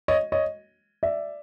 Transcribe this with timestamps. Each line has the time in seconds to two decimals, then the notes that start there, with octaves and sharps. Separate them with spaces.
0.08 C#5 D#5
0.32 C#5 D#5
1.03 D5 E5